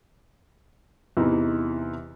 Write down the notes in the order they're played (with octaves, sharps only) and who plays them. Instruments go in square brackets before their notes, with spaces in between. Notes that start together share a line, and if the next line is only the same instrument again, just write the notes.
[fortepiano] E2 C3 E3 D#4 E4